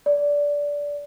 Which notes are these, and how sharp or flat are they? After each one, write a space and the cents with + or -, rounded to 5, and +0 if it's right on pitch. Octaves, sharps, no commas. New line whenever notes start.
D5 -15